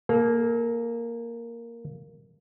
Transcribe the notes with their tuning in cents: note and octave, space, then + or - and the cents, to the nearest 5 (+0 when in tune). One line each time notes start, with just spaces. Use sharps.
A#3 +0 A4 -40